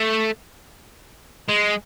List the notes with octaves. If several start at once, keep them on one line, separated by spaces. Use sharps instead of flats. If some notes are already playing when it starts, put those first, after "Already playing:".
Already playing: A3
G#3